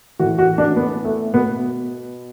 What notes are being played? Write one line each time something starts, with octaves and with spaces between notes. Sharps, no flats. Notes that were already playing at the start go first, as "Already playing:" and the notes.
A2 E3 F#4
F#4
D4
B3
A3
B2 B3